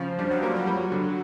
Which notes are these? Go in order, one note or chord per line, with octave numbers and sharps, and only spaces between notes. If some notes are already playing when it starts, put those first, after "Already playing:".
Already playing: C#3 F3
G3 D4
F#3
G3 A#3
F#3
G3
D3